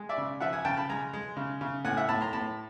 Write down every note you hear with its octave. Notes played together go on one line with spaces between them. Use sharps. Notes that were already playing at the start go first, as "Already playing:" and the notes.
Already playing: G#3
D5 E5
C#3
F3 E5 F#5
F#5 G#5
C#3 G5 A5
A5 B5
G#3 G#5 A#5
G#3
C#3
C#3
A2 F#5 G#5
E5 F#5
A2 A5 B5
A#5 C6
A2 A5 B5